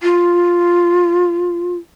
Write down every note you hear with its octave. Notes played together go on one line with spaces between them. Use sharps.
F4